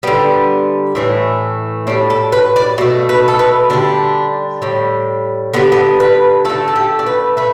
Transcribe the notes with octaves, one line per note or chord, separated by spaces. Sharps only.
D3 G3 B3
A2 E3 A3
A2 G3 D4
A4
B4
D5
B2 A3 D5
B4
A4
B4
D3 G3 D4
A2 G3
D3 G3 B3
B3
B4
D3 A3 A4
A4
G4
D5
B4
A3 B4